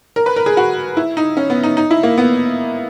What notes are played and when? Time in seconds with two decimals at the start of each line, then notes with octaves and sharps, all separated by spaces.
0.16 A#4
0.26 B4
0.36 A#4
0.46 G#4
0.57 F#4
0.97 E4
1.17 D#4
1.37 C#4
1.50 B3
1.63 D#4
1.77 D#4
1.91 E4
2.03 A#3
2.18 B3